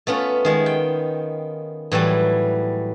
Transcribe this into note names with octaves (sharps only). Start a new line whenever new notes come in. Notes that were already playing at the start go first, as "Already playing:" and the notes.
A3 B3 C#4 F4
D#3 G#3 B3
G5
A2 E3 F#3 G3